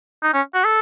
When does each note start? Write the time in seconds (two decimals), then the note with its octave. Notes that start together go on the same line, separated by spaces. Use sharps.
0.23 D#4
0.34 C#4
0.54 F#4
0.65 A4